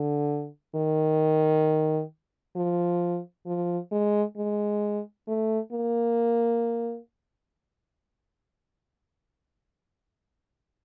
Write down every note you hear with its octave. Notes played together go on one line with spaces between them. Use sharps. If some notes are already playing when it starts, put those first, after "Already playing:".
Already playing: D3
D#3
F3
F3
G#3
G#3
A3
A#3